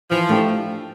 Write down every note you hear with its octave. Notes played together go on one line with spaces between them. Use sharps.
E3 F3
A3 D4 G4